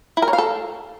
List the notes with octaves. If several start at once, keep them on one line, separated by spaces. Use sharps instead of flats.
E4
A#4
C#5
F5
A4